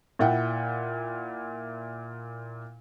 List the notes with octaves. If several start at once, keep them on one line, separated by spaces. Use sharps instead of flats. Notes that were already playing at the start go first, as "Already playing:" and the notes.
A#2 E4 F#5 G5